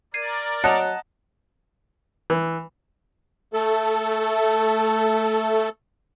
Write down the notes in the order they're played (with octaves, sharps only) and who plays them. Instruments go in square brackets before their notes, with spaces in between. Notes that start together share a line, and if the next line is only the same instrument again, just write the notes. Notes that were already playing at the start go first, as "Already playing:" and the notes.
[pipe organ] A#4 D5 [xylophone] G#6 C7 D#7
[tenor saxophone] F#3 [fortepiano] D#5 A5 F#6 [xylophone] F#5 A#5
[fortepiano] E3
[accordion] A3 A4